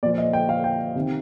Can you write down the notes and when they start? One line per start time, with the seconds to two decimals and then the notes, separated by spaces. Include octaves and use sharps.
0.03 A#2 F3 D5
0.18 D#5
0.33 G5
0.49 F5
0.64 G5
0.95 C3 D#3